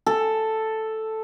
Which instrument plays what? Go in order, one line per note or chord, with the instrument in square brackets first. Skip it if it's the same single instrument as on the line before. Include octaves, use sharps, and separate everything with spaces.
[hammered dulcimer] A4